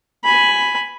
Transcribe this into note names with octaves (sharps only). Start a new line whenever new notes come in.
G#5 B5